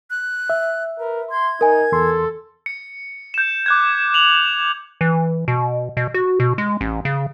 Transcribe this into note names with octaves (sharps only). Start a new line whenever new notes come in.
F#6
E5
A#4 B4
C6 G#6
D#4 A#4 G#5
E2 A4 C6
C#7
G6 E7
D6 F#6 G#6
F7 F#7
E3
B2
B2
F#4
B2
G#3
A1
C#3